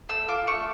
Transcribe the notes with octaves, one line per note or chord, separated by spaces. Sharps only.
A3 E6
F4 D6
A3 C#6